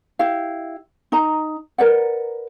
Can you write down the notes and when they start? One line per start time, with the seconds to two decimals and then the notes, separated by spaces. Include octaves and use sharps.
0.19 E4 G4 F5
1.12 D#4 A#5
1.78 A#4 B4 D5 F#5